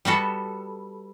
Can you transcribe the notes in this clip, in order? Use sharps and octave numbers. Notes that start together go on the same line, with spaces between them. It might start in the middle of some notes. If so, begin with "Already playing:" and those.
G3 B3 F#4 A4